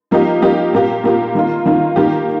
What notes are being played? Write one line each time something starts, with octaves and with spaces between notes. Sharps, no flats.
F3 A#3 D#4 G4
F3 A#3 D#4 G4
A#2 A#3 G4
A#2 A#3 G4
D#3 A#3 F4
D#3 A#3 F4
D#3 A#3 G4